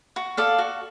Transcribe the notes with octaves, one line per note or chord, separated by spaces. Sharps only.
F#4
A4 D5 F5
F#4